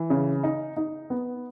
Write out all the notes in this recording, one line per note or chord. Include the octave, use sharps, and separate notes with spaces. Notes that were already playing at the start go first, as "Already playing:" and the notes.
Already playing: E3
C#3
D#4
D#4
B3